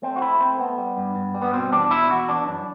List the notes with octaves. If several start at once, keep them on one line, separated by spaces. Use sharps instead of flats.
A3 C4
F#4
A3 E4
A3 C4
A3 B3
G3
G2
G2
G3
B3
B2 C4
E2 D4
B2 E4
E2 F#4
E3 D4
F#2 D4